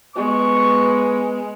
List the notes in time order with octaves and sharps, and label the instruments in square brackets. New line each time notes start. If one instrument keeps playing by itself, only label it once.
[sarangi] G#3 [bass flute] B3 [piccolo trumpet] C#6